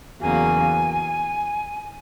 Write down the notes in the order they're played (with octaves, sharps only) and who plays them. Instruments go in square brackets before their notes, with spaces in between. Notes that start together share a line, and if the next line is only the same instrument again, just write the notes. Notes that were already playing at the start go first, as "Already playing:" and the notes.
[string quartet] E2 C#3 F#3 A#3 [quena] G#5